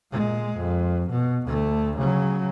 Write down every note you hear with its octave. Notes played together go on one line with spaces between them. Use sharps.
A#2 G#3
F2
B2
D2 A3
C#3 F#3